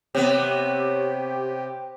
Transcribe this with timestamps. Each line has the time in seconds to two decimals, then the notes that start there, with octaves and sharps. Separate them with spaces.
0.15 C3 B3 G4 C#5